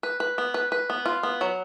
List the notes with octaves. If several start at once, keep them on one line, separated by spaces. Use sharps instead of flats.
B4
B4
B3
B4
B4
B3
F4
B3
F#3